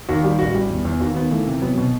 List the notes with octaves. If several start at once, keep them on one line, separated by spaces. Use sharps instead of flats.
D#2 F#4
G3 G4
A1 F#4
G3
E2
E2
D#2 F#4
D#2 B3
E3 A3
C3
F#3 B3
B2 B3